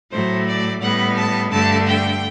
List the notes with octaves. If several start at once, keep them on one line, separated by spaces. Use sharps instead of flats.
A2 F#3 A3 C5
D5
A2 G3 B3 F#5
A5
G2 D3 A3 A5
G5